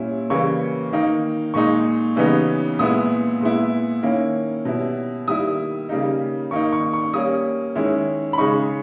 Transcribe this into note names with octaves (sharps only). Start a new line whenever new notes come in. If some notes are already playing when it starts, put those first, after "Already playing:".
Already playing: A#2 G3 C#4 E4
C#3 E3 G3 A#3 C#6
D#3 A#3 D#4
A#2 G#3 D#4 C#6
C#3 E3 G3 B3 D#4
A#2 G#3 B3 E4 D#6
A#2 G#3 B3 E4
D#3 A#3 C#4 E4
B2 G3 C#4 E4
D#3 G3 A#3 E4 D#6
C#3 G3 A#3 D#4
D#3 A#3 D#4 C#6
C#6
C#6
G3 A#3 C#4 D#6
D#3 G#3 C#4 E4
B5
C#3 G#3 D#4 C#6